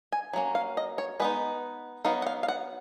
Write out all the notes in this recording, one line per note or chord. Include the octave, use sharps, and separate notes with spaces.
G#5
F#3 A#3 C#4
F5
D#5
C#5
G#3 B3 D#4 B4
F#3 B3 D#4 F5
F#5
F5
F5
F#5